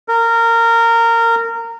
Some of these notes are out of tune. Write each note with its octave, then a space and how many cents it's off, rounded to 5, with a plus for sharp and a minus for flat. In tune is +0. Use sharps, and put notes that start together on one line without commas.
A#4 -20